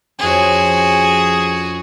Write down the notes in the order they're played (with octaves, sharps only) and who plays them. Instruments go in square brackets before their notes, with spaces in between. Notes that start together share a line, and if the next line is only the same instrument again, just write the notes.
[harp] F2 C#4 [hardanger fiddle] F#4 G#4